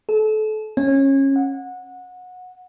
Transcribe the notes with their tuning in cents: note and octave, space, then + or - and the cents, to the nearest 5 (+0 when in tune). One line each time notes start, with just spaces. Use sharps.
A4 -30
C#4 -25
F#5 -20